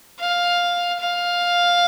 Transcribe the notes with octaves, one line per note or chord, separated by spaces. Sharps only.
F5
F5